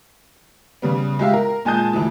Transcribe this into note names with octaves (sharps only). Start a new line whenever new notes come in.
C#3 G3 B3
G#3 G4 E5 F5
A#4
A#2 G#3 G#5 A5 D#6 G6
D2 E3